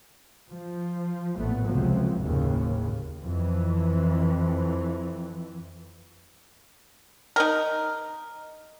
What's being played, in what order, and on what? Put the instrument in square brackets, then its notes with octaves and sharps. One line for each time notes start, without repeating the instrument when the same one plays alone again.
[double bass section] F3
A1 A#2 A3 B3
C#2 C3 F3 F#3
F#1 D#2 A2 C#3
F2 E3
[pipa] D#4 A#4